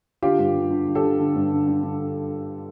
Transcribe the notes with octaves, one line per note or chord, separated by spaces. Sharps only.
D3 F4 G4
G2
D3
D3
D3
G4 A4
D3
D3
G2
D3
D3
D3